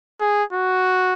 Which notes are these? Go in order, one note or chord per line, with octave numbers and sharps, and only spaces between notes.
G#4
F#4